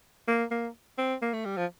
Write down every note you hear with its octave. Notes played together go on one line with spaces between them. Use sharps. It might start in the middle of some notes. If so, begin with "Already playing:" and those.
A#3
A#3
C4
A#3
A3
G3
F3